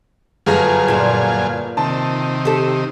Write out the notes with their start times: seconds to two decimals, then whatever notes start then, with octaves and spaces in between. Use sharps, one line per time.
0.46 G1 F#2 F4 G#4 G#5 A#5
0.88 A#2 D4
1.77 C3 D#3 A5
2.45 G4 A4